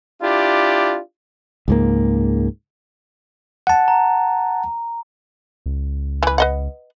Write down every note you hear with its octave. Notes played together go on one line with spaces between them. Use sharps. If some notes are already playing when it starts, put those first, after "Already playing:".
D4 E4 F4 G4
C#2 G#2 A#3
F#5 A5
A#5
C#2
E3 B4
B4 D#5 F#5